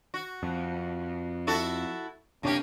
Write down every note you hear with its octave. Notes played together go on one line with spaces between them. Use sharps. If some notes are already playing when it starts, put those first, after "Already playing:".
F#4
F2
E4 F#4 A4
F#1 C3 A#3 C#4 D4 G4